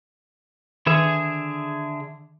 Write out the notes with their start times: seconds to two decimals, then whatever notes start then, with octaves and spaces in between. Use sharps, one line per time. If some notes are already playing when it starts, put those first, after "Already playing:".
0.86 D3 D#3 G#4 E5